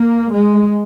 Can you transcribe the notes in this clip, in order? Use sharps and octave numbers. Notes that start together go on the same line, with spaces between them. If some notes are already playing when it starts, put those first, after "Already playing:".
Already playing: A#3
G#3